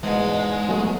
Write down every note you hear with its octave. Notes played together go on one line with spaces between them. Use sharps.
E2 G#2 B2 G#3
F#3 A3 B3